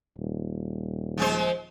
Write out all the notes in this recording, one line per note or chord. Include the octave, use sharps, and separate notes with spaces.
D#1
F3 G#3 C5